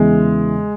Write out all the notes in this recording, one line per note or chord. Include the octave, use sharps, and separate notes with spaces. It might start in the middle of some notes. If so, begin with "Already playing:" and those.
Already playing: E2 C#3 E3 G#3